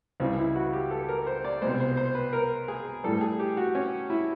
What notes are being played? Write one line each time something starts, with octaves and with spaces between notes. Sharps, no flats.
C#2 C#3 E3 G3 C4
E4
F#4
G4
A4
A#4
C5
D5
C2 B2 G#3 C5
C5
C5
B4
A#4
G#4
A2 E3 G3 A4
G#4
G4
F#4
C#4
E4